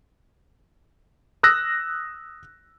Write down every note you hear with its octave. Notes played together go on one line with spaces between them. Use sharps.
D#6 E6 F#6 A#6